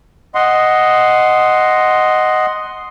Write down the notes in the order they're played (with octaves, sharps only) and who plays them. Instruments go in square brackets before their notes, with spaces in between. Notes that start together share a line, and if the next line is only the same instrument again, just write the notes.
[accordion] D#5 F#5 C6